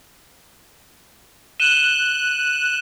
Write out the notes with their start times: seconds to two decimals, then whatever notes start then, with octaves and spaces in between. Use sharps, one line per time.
1.60 F#6 D#7 E7 G7